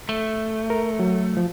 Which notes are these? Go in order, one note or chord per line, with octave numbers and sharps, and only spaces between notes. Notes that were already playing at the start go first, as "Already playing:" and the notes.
A3
A#4
F#3
F3